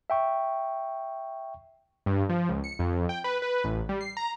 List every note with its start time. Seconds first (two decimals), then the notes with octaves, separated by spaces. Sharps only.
0.10 E5 G5 C#6
2.06 G2
2.29 F3
2.49 C#2
2.64 C#7
2.79 F2
3.09 G5
3.24 B4
3.42 B4
3.64 A1
3.89 G3
4.01 C7
4.17 A#5